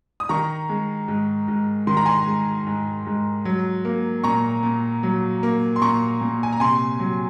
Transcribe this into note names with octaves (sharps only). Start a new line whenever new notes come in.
D#6
D#3 A#5 C#6
G#3
G#2
G#2
D#3 C6
A#5
G#5 C6
G#3
G#2
G#2
F#3
A#3
A#2 A#5 C#6
A#2
F#3
A#3
C6
A#2 A#5 C#6
A#2
G#5
A#5
C3 G#5 C6
F#3